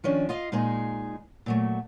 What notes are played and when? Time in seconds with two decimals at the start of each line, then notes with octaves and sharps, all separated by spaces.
0.04 D#3 F3 C#4 D4
0.29 F4 D#5 F5
0.52 A#2 G#3 D#4 G#4
1.46 A#2 F#3 A3